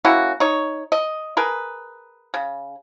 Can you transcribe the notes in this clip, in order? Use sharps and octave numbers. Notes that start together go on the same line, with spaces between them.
A#3 C#4 E4 F#4
D#4 C#5
D#5
G#4 A#4 B4
C#3